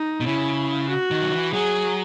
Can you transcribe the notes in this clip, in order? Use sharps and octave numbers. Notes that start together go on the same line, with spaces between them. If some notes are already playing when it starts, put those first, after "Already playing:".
Already playing: D#4
B2
C#3 E4
F#4
D#3
F#3
E3
F#3 G#4